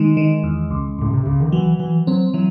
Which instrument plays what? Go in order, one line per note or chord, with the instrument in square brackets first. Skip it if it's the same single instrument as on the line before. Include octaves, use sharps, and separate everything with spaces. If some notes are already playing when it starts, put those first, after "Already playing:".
Already playing: [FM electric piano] D#3 [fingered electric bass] G#3
[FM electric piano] D#3
E2
C#2
[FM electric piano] C#2 [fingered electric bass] A2
[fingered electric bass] C3
[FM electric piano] C#2 [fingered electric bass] C#3
[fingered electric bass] D#3
[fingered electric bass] E3 [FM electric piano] F#3
[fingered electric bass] E3 [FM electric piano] F#3
[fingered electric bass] F#3 [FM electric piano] C4
[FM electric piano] E3 [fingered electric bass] F#3